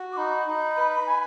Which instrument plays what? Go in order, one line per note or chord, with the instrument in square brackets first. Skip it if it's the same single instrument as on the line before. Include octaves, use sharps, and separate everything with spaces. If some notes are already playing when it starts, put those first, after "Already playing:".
Already playing: [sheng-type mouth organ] F#4
[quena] D6
[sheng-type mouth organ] D#4 [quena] B5
[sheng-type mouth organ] D#4
B4
G#5